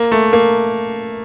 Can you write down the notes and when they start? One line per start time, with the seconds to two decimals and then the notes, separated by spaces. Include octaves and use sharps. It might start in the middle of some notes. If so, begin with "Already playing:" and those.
Already playing: A#3
0.12 A3
0.33 A#3